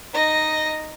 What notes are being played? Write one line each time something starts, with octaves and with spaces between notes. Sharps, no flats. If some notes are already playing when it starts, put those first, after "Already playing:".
D#4 D#5